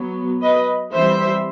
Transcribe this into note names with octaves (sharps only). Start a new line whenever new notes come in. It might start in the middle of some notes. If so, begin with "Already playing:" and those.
Already playing: F#3 B3
B4 D#5
E3 G3 C4 C5 E5